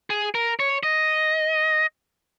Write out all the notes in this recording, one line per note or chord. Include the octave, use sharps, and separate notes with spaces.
G#4
A#4
C#5
D#5